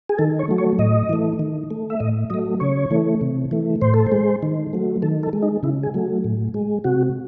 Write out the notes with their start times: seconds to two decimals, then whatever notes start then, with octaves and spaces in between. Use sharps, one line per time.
0.09 G#4
0.18 D#3 A4
0.39 C#5
0.48 F#3 A3
0.58 C#5
0.79 A2 D#5
1.09 E3 A3
1.39 D#3
1.70 A3
1.90 E5
2.00 A2 D#5
2.30 F#3 A3 D#5
2.60 C#3 C#5
2.91 E3 A3
3.21 C3
3.51 E3 A3
3.81 A2 C5
3.94 A4
4.07 C5
4.12 G#3
4.42 D#3
4.73 F#3 A3
5.02 D#3 A4
5.23 A4
5.33 G#3
5.43 D#4
5.63 C#3 E4
5.83 G#4
5.94 F#3 A3
6.24 A2
6.54 G#3
6.84 C3 F#4